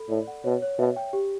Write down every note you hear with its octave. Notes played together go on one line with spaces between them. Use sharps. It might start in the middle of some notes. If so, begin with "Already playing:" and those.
Already playing: A4 B5
A2 D5
F#5
B2 C#5
C#5
B2 E5
G5
G4